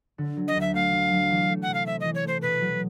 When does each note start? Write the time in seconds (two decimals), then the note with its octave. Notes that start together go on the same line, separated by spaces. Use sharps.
0.18 D3
0.37 F#3
0.48 D#5
0.55 D2
0.61 E5
0.74 A3 F5
0.93 D3
1.11 F#3
1.31 E3
1.49 A3
1.62 F#5
1.68 C3
1.74 F5
1.86 C4 E5
2.00 E3 D#5
2.15 C#5
2.23 A3 C5
2.42 B2 B4
2.60 F#3